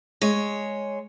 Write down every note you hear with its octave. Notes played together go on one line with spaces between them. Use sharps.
G#3 C#5